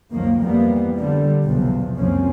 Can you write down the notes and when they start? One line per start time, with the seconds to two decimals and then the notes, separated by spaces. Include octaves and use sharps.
0.11 C#2 F#2 D#3 F3 A#3
0.42 F2 E3 F3 G3 A#3 B3
0.96 D3 G3
1.45 B1 E2 C3 F3
1.98 C#2 F#2 F3 A#3 C4 C#4